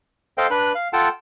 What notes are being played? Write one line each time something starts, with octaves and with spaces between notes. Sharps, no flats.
A4 C5 D#5 F5 G5
D4 B4 B5
F5
F4 A4 F#5 G5 A5